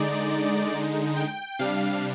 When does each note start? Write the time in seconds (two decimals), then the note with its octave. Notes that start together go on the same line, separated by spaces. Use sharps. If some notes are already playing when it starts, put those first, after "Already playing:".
Already playing: D3 G#3 D#4 D5
1.17 G5
1.59 C3 G3 D4 F5